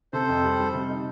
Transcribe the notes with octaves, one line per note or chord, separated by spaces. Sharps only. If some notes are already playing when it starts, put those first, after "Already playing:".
C3 A4 C5
F2
G3
G3
C3
D#4